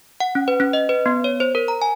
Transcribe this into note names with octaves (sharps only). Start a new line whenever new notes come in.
F#5
C#4
B4
C#4
D#5
B4
B3
C#5
C5
A#4
A#5
G#5